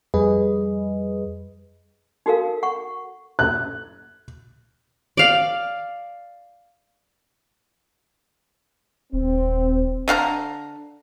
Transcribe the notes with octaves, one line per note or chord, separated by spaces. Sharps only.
F2 G3 G#4 B4 D#5
D#4 F#4 A4 A#4 F5
F#5 C#6
F#6
D5 F5
D#1 C4
D3 F5 F#5 A#5